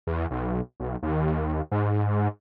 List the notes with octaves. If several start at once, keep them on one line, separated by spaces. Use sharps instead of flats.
E2
B1
B1
D#2
G#2